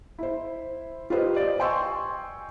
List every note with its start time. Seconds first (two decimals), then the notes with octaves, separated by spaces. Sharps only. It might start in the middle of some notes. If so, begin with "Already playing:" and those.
0.19 E4 C5
1.10 F4 G4 B4 C5 D#5
1.36 D5 D#5
1.59 D#5 G5 G#5 C6 C#6 E6